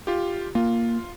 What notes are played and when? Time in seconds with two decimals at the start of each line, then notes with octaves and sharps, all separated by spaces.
0.07 F4 G4
0.55 A#3 F4